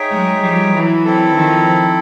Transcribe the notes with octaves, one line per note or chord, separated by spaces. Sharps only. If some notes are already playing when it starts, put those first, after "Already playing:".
Already playing: D#4 G#4 C#5 E5 G5
F#3 G#3
F3 G3
E3 F#3
C4 E4 A4
D#3 F3